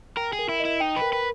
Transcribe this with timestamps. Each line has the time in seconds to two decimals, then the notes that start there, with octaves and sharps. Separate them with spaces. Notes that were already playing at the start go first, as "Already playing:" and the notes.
0.17 A#4 G5
0.33 G#4
0.39 A#4
0.49 E4
0.60 D#5
0.65 E4
0.80 D#4 G5
0.96 B4
1.02 A#4
1.13 B4